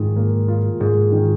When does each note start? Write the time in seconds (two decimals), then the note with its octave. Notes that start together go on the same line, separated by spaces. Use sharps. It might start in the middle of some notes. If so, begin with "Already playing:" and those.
Already playing: G#2 D#3 F4 G#4
0.16 A#3
0.48 F4
0.80 G#2 G#4
1.12 D#3